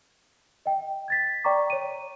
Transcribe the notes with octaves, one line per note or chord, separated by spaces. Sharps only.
D#5 G5
G#6 A6 B6
D5 G5 A#5 C#6 D6
C#5 D#7